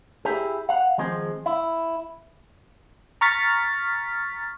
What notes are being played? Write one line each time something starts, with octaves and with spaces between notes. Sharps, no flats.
E4 G4 G#4
F5 F#5
D#3 F3 G#3 C4 G#4
E4
A#5 C#6 F6 A6 B6